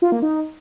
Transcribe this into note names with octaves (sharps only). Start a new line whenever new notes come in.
F4
A#3
D#4